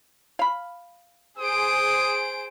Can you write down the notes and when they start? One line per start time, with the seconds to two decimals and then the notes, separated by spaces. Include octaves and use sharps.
0.39 F5 B5
1.39 G#4 C5 D#6 D7